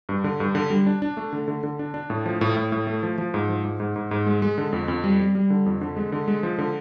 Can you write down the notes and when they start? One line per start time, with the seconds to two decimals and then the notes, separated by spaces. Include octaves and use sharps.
0.09 G2
0.24 D3
0.40 G2
0.55 D3
0.70 G3
0.86 D4
1.02 D4
1.17 A3
1.33 D3
1.48 D3
1.63 D3
1.79 D4
1.94 D4
2.10 A2
2.26 F3
2.41 A2
2.57 A2
2.72 A2
2.87 A3
3.03 F3
3.18 F3
3.34 G#2
3.49 F3
3.65 G#2
3.80 G#2
3.96 G#2
4.11 G#2
4.26 G#3
4.42 G#3
4.58 D3
4.73 F2
4.88 F2
5.04 G3
5.20 G3
5.35 G3
5.50 D3
5.66 F2
5.81 D3
5.97 G#3
6.12 D3
6.28 G#3
6.43 F3
6.58 D3